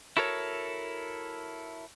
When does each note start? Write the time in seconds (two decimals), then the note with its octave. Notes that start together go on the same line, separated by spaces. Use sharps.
0.17 E4 F#4 A4 A#4 C#5